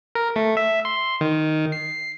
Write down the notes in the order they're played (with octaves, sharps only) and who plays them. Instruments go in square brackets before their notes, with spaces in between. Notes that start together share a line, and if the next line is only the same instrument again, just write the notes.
[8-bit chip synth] A#4
A3
E5
C6
D#3
C7